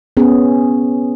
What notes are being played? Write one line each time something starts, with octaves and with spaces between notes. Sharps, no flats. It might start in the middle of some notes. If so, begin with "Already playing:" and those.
B3 C#4 G#4